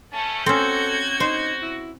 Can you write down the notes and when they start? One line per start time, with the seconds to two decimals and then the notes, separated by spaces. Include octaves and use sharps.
0.12 A3 C#4 A5
0.46 C4 C#4 F#4 A4 G6 G#6
1.20 D#4 C5
1.62 E4